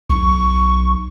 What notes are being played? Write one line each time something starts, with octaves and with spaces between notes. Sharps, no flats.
B1 C#6